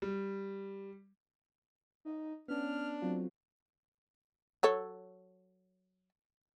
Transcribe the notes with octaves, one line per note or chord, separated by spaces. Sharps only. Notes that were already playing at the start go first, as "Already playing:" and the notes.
G3
D#4
B3 C#4 D4 F6
F#3 A3 C4 F4
F#3 A4 C#5